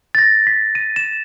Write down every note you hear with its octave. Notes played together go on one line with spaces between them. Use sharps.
A6
A#6
B6
D#7
E7